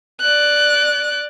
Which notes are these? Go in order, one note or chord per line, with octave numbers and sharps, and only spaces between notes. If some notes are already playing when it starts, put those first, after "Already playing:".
D5 F#6